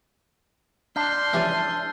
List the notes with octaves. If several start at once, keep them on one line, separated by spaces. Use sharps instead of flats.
D4 C6 F6 G6 B6
E3 G3 C#4 E6 A6 D#7